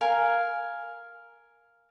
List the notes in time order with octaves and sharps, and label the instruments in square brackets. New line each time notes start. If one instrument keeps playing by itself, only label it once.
[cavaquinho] A#4 F5 G#5